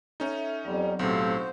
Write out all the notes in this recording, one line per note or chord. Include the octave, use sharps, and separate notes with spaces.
C#4 D#4 A4 E5
F2 F#3 G3 B3 C4
B1 A2 C3 F#4 A4 C5 F5